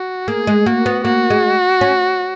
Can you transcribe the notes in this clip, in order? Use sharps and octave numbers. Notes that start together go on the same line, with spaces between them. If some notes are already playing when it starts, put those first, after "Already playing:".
Already playing: F#4
A#3 G#4
G#3
A#3 F#4
B3
A#3 F#4
G#3
C#4